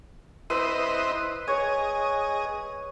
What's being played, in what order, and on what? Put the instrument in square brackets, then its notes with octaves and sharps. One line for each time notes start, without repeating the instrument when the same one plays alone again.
[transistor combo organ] E4 C5 D#5 [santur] B4
[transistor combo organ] G#4 D#5 [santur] C#5